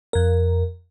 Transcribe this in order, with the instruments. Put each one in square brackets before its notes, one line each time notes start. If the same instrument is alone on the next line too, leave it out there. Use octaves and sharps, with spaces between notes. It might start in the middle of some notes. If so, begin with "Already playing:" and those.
[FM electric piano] F2 A#4